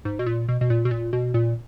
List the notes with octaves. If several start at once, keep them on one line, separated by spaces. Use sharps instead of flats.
G#2
B2
A#2
B2
B2
A#2
B2
A#2
B2
A#2